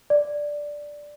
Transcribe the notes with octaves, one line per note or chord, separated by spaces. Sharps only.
D5